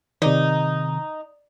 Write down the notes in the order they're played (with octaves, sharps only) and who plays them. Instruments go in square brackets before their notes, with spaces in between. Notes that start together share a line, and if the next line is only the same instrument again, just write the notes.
[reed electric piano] C3 D#3 [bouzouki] D#4